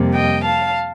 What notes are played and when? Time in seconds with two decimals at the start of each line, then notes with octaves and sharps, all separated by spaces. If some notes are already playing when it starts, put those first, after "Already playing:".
Already playing: F2 C3 G3 A#3
0.13 D#5 G5
0.44 F5 A5